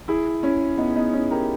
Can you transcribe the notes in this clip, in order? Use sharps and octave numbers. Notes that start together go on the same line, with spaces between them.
E4 G#4
C#4 E4
B3 D#4
B3 D#4
C#4 E4
G4 A#4